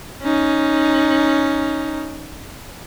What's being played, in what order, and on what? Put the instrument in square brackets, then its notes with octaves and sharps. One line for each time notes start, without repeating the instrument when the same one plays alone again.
[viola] C#4 D#4